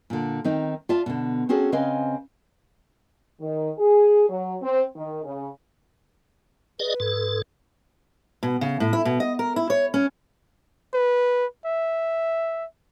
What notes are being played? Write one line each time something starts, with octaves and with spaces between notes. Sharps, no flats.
A#2 D3
D#3 C4 D#4
F4 D5 E5 A5
B2 D3
C4 C#4 F#4 G#4 A4
C#3 C4 B4 D#5 F5 G#5
D#3
G#4
F#3
C4
D#3
C#3
G#4 B4 D5 D#5
G#2 A4
B2
C#3
A2
E4
B2
D#5
A#4
E4
C#5
C#4
B4
E5